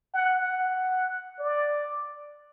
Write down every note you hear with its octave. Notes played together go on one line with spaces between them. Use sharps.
F#5
F#5
D5